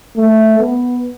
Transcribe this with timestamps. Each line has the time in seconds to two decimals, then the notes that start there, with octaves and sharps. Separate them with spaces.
0.16 A3
0.59 B3